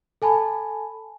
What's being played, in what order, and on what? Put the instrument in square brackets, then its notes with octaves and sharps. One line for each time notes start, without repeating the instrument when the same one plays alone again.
[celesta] A4 G#5 A5 B5